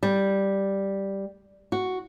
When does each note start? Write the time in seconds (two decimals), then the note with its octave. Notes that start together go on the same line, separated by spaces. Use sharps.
0.03 G3
1.72 F#4